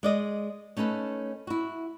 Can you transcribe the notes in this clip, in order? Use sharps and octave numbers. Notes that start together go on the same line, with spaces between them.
G#3 D5 D#5
A3 C#4 D#4 A4 B4
E4 F#4